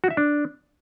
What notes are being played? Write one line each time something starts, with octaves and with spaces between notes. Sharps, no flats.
F#4
E5
D4